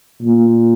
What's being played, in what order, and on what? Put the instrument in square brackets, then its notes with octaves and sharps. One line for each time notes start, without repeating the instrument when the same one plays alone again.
[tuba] A#2